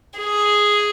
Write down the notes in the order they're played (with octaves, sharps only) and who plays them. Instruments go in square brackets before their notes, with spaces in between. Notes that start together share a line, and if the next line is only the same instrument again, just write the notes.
[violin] G#4